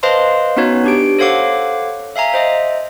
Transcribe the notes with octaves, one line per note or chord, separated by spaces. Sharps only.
B4 C5 D#5 F5 A5 C6
B3 C#4 D#4 F#4 B4 C#5
D4 G4 D7
A4 C5 C#5 F5 F#5 D6
E5 F5 G#5 A#5
C5 D#5 E5